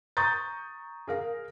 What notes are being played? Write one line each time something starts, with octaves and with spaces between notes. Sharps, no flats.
A#5 C#6 D#6 G6 A6
G#4 A#4 F5